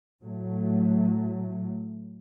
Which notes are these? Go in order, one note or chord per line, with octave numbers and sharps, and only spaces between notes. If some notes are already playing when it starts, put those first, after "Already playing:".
A2 F#3 A3